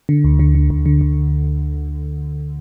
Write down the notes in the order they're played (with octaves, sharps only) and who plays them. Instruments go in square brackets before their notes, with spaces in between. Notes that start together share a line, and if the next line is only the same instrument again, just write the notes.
[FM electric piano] D3
D2
D3
D3
D2
D3
D2